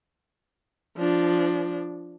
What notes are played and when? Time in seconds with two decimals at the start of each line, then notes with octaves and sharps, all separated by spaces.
0.97 F3 D4